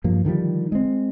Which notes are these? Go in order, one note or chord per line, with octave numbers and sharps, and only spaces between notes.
G2 F3 A#3
D3 D#3 F3 G3
G#3 C4